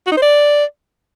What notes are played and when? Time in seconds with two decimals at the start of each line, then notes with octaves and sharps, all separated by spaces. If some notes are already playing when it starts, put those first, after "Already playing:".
0.07 F#4
0.12 D#4
0.17 C5
0.22 D5